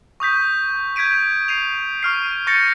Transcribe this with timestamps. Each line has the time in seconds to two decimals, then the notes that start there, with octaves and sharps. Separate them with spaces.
0.20 C#6 D#6 G6 B6
0.96 G6 G#6 B6 D7 D#7
1.48 C7 D#7 F7
2.03 C#6 F6 C7
2.47 C#6 G6 A6 A#6 C#7